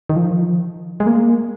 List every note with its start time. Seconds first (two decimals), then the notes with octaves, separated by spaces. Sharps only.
0.09 D#3
0.16 F3
1.00 G#3
1.07 A#3